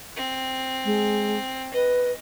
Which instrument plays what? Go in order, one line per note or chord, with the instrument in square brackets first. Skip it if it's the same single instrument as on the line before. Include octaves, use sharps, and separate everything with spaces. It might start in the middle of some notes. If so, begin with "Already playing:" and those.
[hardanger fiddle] C4
[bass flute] G#3
[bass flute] B4 [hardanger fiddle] D#5